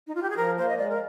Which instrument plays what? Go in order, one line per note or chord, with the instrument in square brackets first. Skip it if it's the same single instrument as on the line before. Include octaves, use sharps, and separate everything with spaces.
[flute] D#4
F4
G4
G#4
[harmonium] F3 [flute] A#4
[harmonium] A#3 [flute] C5
[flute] D#5
[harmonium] G#3 [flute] D5
[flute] A#4